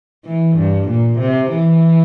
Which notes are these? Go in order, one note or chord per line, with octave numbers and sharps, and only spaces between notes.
E3
G2
A#2
C3
E3